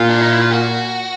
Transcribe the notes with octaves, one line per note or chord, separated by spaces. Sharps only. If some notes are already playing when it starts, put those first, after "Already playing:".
Already playing: A#2 F4
D4
D#4
E4
F4
F#4